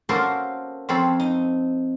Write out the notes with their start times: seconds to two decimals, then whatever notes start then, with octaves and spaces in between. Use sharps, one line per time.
0.09 A#3 C#4 F#4 A4 A#4 C5
0.89 F2 C4 A4 C#5 B5
1.20 D#4